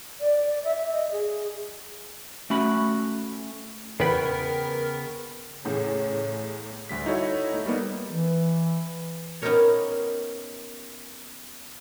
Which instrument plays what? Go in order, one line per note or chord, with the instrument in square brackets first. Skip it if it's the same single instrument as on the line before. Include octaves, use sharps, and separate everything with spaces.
[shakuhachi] D5
E5
D#5
G#4
[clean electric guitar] A3 C#4 F#4 B5
[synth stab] E2 B4 [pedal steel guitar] C#3 B3 G5 [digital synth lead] A#4
[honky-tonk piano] E2 A2 [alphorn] C#3
[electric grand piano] D2 G3 B6
D#4 E4 F#4 A4 C#5
A3 D#4
G3 A#3 B3 D#4
[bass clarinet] E3
[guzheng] B3 C#4 D#4 G4 A#4 C#5